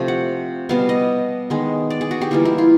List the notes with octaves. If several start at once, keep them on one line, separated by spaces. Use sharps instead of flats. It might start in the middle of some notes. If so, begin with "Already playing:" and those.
Already playing: C3 F3 A3
F#5
B2 G3 B3 F5
D#5
D#3 G#3 B3
D5
G#4
F#4
G4
E3 G3 A#3 F4
E4
F4